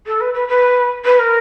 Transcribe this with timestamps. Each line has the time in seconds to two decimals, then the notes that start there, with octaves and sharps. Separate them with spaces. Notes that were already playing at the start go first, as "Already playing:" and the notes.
0.06 A4
0.20 B4
0.34 B4
0.48 B4
1.05 B4
1.19 A#4